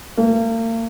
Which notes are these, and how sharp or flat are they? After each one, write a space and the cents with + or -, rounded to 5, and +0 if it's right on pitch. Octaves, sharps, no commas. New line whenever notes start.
A#3 -40